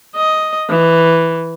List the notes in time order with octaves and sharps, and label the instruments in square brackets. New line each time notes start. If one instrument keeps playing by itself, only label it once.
[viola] D#5
E3